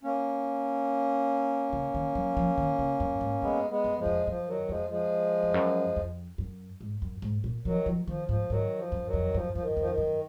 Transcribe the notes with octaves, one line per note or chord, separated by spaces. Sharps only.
A#3 C#4
C#3
D#3
F#3
F3
D#3
C#3
F#2
G#2
F#2 G#3 B3
G#3 B3
F#2
F3 G#3
F2
F#2 F3
D#3 F#3
F2 F3 G#3
F3 G#3
F2
F#2
F2
F#2
G#2
F#2
G#2
A#2
D#3 F3 F#3
F3
D#3 F3
G#2 F3
G#2 D#3 F#3
F3
F#2
D#3 F#3
F2
F#2 F3
F#2 F3
D#3
F2 F3
D#3
F#2